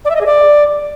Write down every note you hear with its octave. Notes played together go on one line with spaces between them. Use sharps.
D5
E5
D#5
G#4
D5